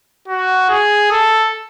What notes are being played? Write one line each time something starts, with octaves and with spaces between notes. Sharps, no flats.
F#4
G#4
A4